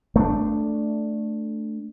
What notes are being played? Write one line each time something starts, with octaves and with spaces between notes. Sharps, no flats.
A3 B3 D4